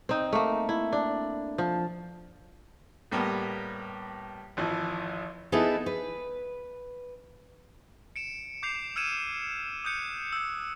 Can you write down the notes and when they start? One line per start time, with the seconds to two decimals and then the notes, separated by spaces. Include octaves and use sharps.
0.09 C4 D#4
0.33 A3 A#3
0.69 E4
0.92 D4
1.58 F3
3.12 A2 G3 A#3 B3
4.57 G#1 E3 F3
5.52 B3 D#4 E4 G#4 A4 B4
5.86 B4
8.16 C#7 D7 E7
8.63 D6 G6 C7 F7
8.96 E6 F6 G#6 C#7 D#7 E7
9.85 D#6 F#6 G6 C#7
10.32 E6 G6